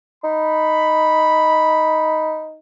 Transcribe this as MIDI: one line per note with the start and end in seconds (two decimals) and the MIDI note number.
0.24 2.57 63
0.24 2.47 83